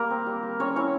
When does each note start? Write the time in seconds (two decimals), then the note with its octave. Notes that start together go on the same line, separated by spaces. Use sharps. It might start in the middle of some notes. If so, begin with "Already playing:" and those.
Already playing: G3 A#3 A#4
0.10 C4
0.26 G3
0.43 G3
0.59 C4 C#4 C#5
0.76 C#4 E4 C#5